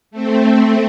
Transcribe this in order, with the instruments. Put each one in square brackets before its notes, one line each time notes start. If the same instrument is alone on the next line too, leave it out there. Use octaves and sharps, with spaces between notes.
[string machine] A3 C4